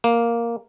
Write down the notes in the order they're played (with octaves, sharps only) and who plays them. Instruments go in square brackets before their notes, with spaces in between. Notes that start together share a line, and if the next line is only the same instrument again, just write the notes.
[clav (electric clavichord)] A#3